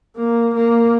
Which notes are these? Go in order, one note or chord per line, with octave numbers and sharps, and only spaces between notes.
A#3
A#3